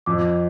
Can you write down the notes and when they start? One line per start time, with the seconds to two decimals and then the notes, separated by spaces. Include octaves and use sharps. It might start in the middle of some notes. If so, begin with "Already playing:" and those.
0.06 F2 D6